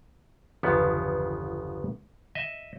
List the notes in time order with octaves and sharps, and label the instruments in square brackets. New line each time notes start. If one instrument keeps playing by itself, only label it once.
[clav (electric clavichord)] G1 E2 C#3 F3 B3
D#5 E5